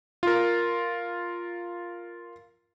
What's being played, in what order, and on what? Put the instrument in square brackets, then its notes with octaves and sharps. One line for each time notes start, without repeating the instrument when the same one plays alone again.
[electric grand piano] F4 A#4